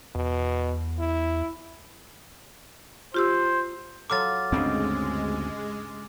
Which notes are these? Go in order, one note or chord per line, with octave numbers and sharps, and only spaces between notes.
E2 B2
E4
F4 G4 C5 E6
F#3 F4 A4 D6 F6 A6
D2 G2 C#3 G#3 C4 D#5